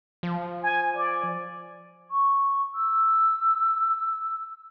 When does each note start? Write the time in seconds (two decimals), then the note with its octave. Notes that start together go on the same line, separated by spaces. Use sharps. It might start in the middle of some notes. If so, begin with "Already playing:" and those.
0.23 F3
0.63 G#5
0.96 D5
2.11 C#6
2.74 E6